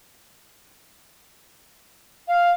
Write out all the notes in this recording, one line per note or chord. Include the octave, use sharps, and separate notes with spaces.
F5